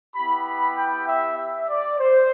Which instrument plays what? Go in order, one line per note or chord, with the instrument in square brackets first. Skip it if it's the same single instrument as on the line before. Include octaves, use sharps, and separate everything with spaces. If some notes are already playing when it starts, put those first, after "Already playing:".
[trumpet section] B3 E4 G4 B5
B5
G5
E5
E5
D5
C5